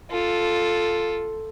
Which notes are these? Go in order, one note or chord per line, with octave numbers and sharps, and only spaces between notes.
F4 A4